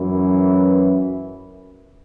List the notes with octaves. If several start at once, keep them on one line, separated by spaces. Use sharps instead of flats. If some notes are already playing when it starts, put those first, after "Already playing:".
Already playing: F#2 E3